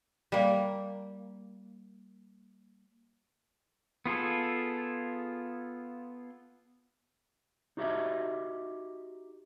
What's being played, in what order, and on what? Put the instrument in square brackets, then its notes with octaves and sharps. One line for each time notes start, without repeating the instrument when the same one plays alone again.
[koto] G3 A#3
[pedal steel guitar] B3 F4 G#4 A4
[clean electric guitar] D#4 F#4 G4 D#5 E5